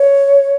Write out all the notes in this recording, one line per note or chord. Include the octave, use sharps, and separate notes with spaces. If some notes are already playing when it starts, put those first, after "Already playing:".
Already playing: C#5